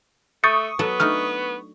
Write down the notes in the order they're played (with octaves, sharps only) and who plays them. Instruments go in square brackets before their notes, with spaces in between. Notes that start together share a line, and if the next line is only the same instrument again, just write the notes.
[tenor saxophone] A3 [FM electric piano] C#6 D#6 [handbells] G6 A6 C#7
[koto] F#3 A4 F#5 [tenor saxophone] B3
[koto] A3 D4 D#4 [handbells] F6